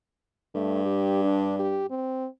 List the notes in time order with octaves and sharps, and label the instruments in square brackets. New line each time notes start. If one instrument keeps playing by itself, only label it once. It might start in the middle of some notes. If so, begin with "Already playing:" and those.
[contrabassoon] G2 [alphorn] A3
[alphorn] G4
D4
G4
C4